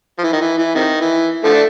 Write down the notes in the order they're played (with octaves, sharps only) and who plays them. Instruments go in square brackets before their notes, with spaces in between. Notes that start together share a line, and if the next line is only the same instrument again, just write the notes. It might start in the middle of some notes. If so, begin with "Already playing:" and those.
[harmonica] F3
E3
D#3
E3
E3
C3 D#3
E3
D3 F3 A3
D4